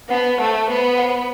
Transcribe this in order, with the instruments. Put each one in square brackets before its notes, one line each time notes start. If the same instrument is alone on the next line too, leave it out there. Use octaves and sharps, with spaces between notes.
[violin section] B3 [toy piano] C5 F#5 A5
[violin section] A3 [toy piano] C5 F#5 A5
[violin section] B3 [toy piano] C5 F#5 B5
[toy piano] C5 F#5 B5